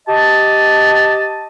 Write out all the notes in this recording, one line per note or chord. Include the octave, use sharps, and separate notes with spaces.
G4 D#5 A5